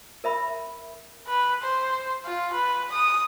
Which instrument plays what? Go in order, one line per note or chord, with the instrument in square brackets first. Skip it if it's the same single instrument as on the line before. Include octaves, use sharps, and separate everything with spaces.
[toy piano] A#4 E5 B5
[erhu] B4
C5
F4
B4
D#6